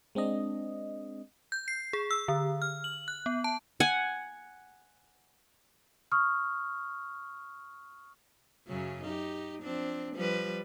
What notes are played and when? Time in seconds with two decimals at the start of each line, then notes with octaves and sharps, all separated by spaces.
0.15 G#3 C4 D4 D#5
1.52 G6
1.68 C7
1.93 G#4
2.11 E6
2.28 D3
2.62 F6
2.84 F#7
3.08 F#6
3.26 B3
3.44 A5
3.80 F#5 G#5
6.12 C#6 D#6 F6
8.67 F#2 C#3 F#3
9.03 D#4 G4
9.63 F3 C4 D4
10.14 F3 G3 B4